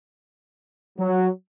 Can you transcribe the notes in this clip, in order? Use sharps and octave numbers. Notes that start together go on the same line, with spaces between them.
F#3